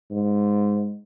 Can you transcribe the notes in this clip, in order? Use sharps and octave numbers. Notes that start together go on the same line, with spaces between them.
G#2